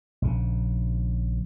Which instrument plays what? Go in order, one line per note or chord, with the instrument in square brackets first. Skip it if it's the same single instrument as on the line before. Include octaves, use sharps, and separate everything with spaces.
[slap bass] A#1 C#3